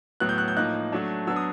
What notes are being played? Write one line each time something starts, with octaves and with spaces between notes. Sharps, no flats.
A2 F#3 B3 F#6
G6
F#6
G6
A2 F3 A#3 D#4 F#6
F#3 A3 D4
F#3 B3 D4 E6
D#6